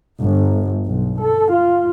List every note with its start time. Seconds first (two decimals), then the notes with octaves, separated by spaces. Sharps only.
0.22 G1
0.85 B1
1.22 A4
1.52 F4